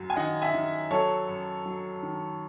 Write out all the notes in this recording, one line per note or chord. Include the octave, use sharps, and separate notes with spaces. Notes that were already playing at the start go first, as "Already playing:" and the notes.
Already playing: F#2 F#3
G#5
D#3 D#5 F#5
E5 G#5
D#3
F#3 A4 C#5
F#2
F#3
D#3